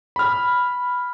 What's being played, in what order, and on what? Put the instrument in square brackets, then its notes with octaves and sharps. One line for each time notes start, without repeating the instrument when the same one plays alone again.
[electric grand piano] B5 F6